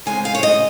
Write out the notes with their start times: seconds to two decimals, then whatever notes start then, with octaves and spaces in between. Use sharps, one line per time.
0.06 C#3 G#3 C4 G#5
0.25 F5
0.35 C#5
0.43 D#5